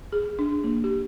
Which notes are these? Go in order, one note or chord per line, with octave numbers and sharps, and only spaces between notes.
G#4
D4
A#3
G4